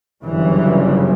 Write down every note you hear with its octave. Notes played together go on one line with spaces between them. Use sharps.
G1 F#2 C#3 E3